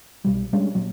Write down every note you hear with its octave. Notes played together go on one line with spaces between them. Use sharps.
B1 B2 G3
G3 G#3 C#4 D4
A#2 F#3